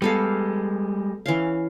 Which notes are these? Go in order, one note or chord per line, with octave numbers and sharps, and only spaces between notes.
G3 G#3 B3 A4 F5
E3 C#4 F5